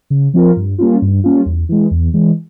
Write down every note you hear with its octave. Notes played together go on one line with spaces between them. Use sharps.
C#3
F3 C4 F4 A#4
G2
G3 A#3 C#4 F4
G2
G3 A#3 C#4 F4
E2
E3 G#3
E2
E3 G#3